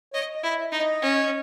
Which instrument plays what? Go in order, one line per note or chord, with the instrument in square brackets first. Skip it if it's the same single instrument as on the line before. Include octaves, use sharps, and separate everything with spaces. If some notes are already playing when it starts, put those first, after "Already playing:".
[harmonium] C#5 [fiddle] D#5
[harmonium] D#5
[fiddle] E4
[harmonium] E5
[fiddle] D#4
[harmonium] D#5
[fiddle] C#4